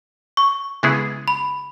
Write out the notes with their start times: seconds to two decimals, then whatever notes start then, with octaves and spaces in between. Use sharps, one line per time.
0.37 C#6
0.83 C#3 G#3 B3 E4 G#4
1.28 B5